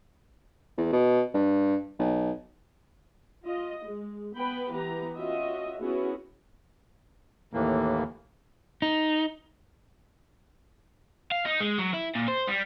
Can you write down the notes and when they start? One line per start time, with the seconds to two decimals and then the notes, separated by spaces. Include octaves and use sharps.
0.78 E2
0.93 B2
1.34 G2
1.99 B1
3.44 F4 D#5
3.85 G#3
4.36 B3 B4 G5 B5
4.70 E3 B3 G4 B4 A#5
5.16 C#4 F4 F#4 D#5 E5
5.80 B3 C#4 E4 F#4 G#4
7.53 D#2 A2 E3 A#3
8.82 D#4
11.31 F5
11.45 D#4
11.60 G#3
11.79 F#3
11.94 E4
12.15 A#2
12.28 C5
12.48 G3